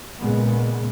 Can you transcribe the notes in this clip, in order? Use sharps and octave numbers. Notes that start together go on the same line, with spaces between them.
A#2 C#3 G#3 B3